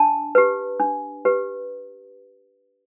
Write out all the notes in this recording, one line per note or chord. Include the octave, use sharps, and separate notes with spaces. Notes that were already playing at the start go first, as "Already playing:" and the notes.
Already playing: D4 A5
G4 B4
D4
G4 B4